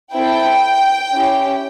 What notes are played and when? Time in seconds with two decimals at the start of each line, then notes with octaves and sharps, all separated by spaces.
0.14 C4 E4 A4 G5
1.13 C#4 E4 G4